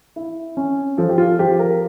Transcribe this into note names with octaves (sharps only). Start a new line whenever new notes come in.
E4
C#4
F3 A4
G4
F4
F3 G4
A#4